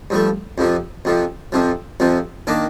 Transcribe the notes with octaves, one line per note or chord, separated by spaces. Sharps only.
G2 F3 A3
F2 C3 F3
F2 C3 F3
F2 C3 F3
F2 C3 F3
D#3 A#3 D4